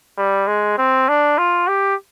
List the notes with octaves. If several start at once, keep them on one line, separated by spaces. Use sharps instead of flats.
G3
G#3
C4
D4
F4
G4